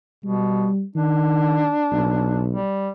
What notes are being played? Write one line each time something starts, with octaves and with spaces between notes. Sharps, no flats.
B2 G3
D#3 D4
B1
G3